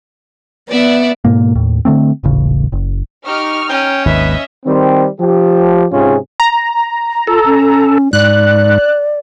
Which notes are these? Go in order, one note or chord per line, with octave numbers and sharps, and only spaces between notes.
B3 D5 E5 F#5
G#2 B2 A#3
D#2 A2
D3 F3 A3 C4
D#1 A1 C#3
F#1
D#4 G4 C#6 F6
C#4 G5
G#1 D#2 B4 D#5 E5
D#3 G3 C4
F3 G4
G#2 C3 C#4 F4 G#4
A#5
F4 A4
C#4
G#2 D5 F#6